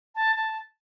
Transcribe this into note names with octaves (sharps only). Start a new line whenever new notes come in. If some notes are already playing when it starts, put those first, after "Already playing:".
A5
A5